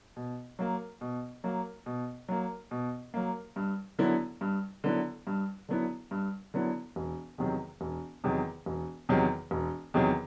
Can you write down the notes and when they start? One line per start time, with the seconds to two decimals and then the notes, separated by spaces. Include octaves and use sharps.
0.16 B2
0.59 F#3 A#3
1.01 B2
1.44 F#3 A#3
1.86 B2
2.29 F#3 A#3
2.71 B2
3.14 F#3 A#3
3.56 G2
3.99 D3 F#3 B3 E4
4.41 G2
4.84 D3 F#3 B3 E4
5.27 G2
5.69 D3 F#3 B3 E4
6.11 G2
6.54 D3 F#3 B3 E4
6.96 E1
7.38 E2 C3 D#3 F#3
7.81 E1
8.24 E2 C3 D#3 F#3
8.66 E1
9.09 E2 C3 D#3 F#3
9.51 E1
9.94 E2 C3 D#3 F#3